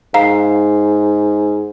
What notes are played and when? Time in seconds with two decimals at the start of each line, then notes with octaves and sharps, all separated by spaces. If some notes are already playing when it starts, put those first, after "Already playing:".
0.14 G#2 F5 A#5 C7